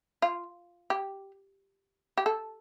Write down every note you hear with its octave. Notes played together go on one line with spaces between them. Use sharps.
F4
G4
G4
A4